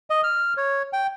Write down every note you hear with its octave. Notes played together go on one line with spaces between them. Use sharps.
D#5
F6
C#5
G5